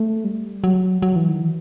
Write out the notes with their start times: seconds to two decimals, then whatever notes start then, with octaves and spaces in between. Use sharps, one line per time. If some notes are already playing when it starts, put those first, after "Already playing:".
Already playing: A3
0.24 G3
0.64 F#3
1.02 F#3
1.16 E3
1.29 D#3
1.42 E3